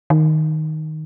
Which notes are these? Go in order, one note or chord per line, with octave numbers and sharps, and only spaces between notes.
D#3